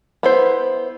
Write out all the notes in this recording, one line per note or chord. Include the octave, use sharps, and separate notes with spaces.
B3 E4 C5